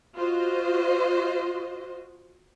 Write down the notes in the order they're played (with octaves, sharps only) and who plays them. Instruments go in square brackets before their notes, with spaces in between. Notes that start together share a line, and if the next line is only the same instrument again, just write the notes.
[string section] F4 F#4 C5 D#5